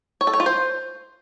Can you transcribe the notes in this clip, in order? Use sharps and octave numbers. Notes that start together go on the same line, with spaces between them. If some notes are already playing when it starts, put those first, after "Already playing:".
C#5
A4
C#5
F4
C5